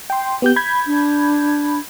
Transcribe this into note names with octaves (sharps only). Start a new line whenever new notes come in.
G5 C6
B3 G4 G6
B5 G6 G#6
D4